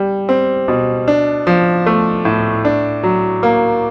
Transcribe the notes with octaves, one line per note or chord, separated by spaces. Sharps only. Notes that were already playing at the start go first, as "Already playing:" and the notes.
Already playing: G3
C4
B2
D4
F3
A3
A2
D4
F#3
A#3